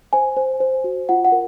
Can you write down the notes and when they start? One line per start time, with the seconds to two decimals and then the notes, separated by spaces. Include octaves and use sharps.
0.13 C5 G#5
0.37 C5
0.60 C5
0.84 F#4
1.09 F4 F#5
1.25 F#5
1.32 A#4